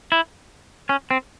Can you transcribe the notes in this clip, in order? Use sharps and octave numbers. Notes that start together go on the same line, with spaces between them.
E4
C#4
C4